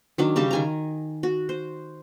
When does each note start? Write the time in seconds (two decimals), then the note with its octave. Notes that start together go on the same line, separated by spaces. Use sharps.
0.18 D#3 F#3 D4
0.36 C#3 G3 G4 A5
0.51 D#3 G#5 A#5
1.23 F#4
1.49 C5